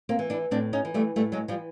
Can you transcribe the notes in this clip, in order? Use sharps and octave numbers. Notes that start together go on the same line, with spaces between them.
A#3 C4
E3
D4 E4
A2 C4 D4
C#4 D#4
E3
G3 A3
A2 G3 A3
F#3 G#3
E3 F3 G3